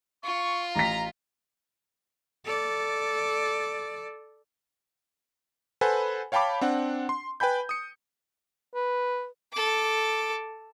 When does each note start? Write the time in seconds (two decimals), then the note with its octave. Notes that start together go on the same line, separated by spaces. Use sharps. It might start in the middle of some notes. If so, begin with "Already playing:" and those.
0.24 F4 C#6
0.76 A1 A#5 B6
2.45 A4 D5
5.81 A4 B4 C5 F#5 G#5 B5
6.32 C#5 F5 G5 A5 B5 D6
6.61 C4 D4 F#5
7.09 C6
7.40 B4 G5 G#5 B5 G6
7.69 D#6 C#7
8.75 B4
9.53 A4 D6